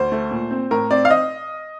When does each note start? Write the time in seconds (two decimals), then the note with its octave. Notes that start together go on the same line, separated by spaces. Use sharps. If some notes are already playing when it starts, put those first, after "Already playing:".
Already playing: D2 C5
0.12 A3
0.31 A#2
0.51 C4
0.71 A2 A#4
0.91 C4 D5
1.05 F5
1.10 D#5